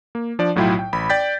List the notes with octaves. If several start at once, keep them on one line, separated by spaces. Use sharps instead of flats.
A#3
F3 D4 D5
B1 A2 F#3 E4 F4 G5
G5
A1 B5
D5 G5 G6 A6 B6